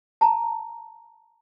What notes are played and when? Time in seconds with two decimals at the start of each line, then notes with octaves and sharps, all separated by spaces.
0.21 A5 A#5